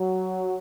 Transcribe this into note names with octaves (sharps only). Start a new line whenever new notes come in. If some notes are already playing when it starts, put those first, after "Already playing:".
Already playing: F#3